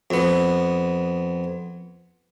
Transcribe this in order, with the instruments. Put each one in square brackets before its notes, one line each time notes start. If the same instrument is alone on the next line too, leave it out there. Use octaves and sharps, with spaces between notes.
[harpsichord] F2 B3